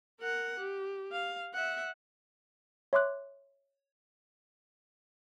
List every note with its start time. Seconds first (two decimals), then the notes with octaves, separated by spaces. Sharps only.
0.20 A#4 F#5
0.59 G4
1.12 F5
1.54 E5 F#5
2.93 C#5 E5 C6 D6 F#6